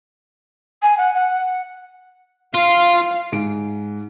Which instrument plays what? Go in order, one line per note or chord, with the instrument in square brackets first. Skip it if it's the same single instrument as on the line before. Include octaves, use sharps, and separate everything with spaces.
[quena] G#5
F#5
F#5
[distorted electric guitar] F4 [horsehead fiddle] F5
[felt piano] G#2 D7